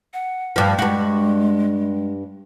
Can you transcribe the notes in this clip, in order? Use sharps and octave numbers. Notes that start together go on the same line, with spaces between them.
F#5
G2 F3
G2 G#3 F#4